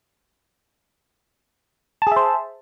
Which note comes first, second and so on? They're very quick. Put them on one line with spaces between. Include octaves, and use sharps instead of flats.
A5 G#4 E5 C5